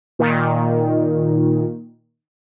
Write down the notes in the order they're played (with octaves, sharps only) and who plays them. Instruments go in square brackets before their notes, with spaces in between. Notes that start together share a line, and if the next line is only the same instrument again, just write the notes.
[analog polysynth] A#2 D#3